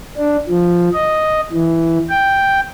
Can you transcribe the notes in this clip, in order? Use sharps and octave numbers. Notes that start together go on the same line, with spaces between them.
D4
F3
D#5
E3
G5